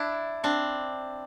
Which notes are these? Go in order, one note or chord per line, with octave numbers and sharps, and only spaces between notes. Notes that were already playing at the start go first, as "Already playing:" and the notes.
Already playing: D4 E4
C4 D4